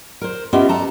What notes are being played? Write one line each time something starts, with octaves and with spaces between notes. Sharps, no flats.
A#4 C5
B3 C#4 F4 G4 D#5 E5
A4 A5 A#5